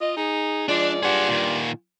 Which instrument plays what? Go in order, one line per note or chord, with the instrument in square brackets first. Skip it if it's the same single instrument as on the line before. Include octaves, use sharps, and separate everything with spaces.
[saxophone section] F4 D#5
D#4 G#4
[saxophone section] F3 G#3 D5 [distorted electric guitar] D4
[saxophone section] G2 F4 D5 [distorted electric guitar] G#4 F#5
[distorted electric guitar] A#2 D#3